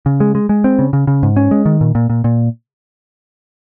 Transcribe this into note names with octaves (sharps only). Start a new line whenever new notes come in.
C#3
G#3
G#3
G#3
C4
C#3
C#3
C#3
G#2
C#4
G#3
D#3
A#2
A#2
A#2
A#2